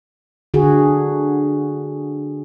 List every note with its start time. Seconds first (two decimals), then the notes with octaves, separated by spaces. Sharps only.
0.54 D3 F#4 G#4